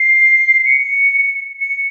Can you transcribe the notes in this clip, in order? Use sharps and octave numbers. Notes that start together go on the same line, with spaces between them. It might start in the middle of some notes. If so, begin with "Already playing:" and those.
Already playing: C7
C#7
C#7